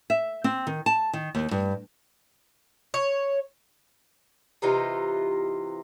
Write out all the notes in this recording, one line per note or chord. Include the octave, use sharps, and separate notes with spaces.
E5
C4
D#3
A5
D#3
D#2
G2
C#5
C3 E3 D#4 F4